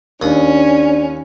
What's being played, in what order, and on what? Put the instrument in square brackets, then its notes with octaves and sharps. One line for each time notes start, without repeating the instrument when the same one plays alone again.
[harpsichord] D#2 D#6 [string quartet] C#4 [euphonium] D4